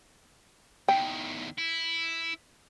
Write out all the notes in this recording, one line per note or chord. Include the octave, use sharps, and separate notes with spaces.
E2 D#3 G5
E4